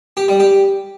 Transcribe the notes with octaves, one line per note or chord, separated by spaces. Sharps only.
G4
G3
G4